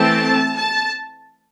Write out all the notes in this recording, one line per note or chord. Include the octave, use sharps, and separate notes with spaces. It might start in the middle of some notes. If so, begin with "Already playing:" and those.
Already playing: E3 A3 C4 A5
A5